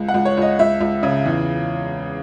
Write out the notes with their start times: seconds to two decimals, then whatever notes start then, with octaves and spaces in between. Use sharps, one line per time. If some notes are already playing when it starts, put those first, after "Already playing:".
Already playing: C#2
0.08 F#5
0.14 C#2
0.25 C#5
0.37 C#2 D#5
0.59 C#2 E5
0.81 C#2
1.03 C#3
1.26 E2